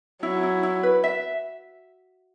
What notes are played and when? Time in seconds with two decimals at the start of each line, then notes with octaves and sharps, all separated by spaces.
0.23 F#3 E4
0.43 E4
0.63 E4
0.83 B4
1.04 E5